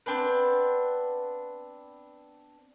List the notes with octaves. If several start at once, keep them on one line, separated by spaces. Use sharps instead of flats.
B3 C4 D4 B4